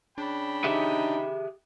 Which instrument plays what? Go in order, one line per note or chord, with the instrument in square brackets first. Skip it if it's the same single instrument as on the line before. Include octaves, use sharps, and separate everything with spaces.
[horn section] C#3 G5 B5 [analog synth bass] D4
[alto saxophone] D#4 [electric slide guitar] G4 G#4 E5